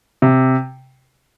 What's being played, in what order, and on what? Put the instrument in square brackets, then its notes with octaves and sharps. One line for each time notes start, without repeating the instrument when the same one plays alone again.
[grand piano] C3